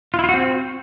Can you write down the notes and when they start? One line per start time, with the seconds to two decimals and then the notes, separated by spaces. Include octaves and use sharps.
0.14 F4
0.19 E4
0.24 F4
0.29 F#4
0.34 C4